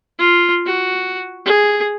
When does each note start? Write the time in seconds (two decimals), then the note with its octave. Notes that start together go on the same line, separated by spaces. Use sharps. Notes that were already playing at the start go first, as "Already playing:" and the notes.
0.19 F4
0.66 F#4
1.45 G#4